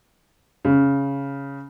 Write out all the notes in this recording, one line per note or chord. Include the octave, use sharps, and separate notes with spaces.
C#3